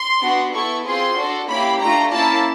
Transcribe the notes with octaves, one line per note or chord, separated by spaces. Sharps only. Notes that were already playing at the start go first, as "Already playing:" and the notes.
Already playing: C6
B3 D4 F#4
B3 E4 A4 C#6
C4 F4 G#4 C6
D4 F#4 A4
A#3 C#4 E4 G4 B5
A3 D4 F4 A#5
A#3 C#4 E4 A5